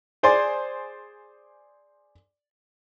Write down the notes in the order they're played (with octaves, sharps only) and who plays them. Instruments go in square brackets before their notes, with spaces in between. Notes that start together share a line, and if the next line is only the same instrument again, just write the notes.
[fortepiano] G#4 C5 D5 G#5 C6